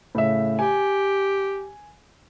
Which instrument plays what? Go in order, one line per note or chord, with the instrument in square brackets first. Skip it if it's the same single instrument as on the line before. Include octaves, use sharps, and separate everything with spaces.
[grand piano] A2 C#3 E5
[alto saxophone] G4 [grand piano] G#5